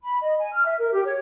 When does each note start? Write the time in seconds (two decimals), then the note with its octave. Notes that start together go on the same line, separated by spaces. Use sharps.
0.02 B5
0.23 D#5
0.38 G#5
0.52 F6
0.65 E5
0.77 A#4
0.93 G4
1.05 C#5